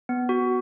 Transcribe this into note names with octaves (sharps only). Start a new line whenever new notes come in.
B3
F#4